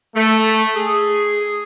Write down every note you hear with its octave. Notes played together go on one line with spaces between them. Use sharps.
A3
G#4